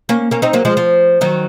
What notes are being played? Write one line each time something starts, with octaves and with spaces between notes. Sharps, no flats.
A#3 C#4
A#3 C#4
C4 D#4
F#3 A#3
F3 G#3
F3
D#3 F#3